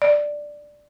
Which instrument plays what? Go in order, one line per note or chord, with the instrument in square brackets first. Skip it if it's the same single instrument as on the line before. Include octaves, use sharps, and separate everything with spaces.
[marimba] D5